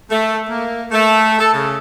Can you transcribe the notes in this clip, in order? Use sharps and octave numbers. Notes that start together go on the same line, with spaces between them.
A3
A#3
A3
A4
C#3